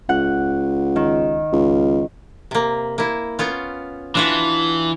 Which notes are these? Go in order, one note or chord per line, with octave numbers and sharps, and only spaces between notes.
C#2 F#5
D#3
C#2
C3 A#3
A#3 E4
B3 C#4 F4
E3 D4 F4 F#4